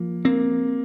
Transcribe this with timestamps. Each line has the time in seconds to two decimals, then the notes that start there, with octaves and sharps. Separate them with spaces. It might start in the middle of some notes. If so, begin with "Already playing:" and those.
Already playing: F3 A#3
0.25 A#3 C4